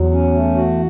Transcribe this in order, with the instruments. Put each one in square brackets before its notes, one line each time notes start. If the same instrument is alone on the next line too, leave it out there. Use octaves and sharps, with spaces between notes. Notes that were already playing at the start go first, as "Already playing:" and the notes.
Already playing: [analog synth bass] E2 [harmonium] F#3
[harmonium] C#4
A3
F#4